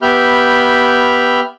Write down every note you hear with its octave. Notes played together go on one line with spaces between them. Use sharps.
B3 G4 E5 B5 F6 G6